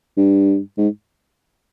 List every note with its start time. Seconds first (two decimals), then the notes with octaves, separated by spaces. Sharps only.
0.17 G2
0.78 G#2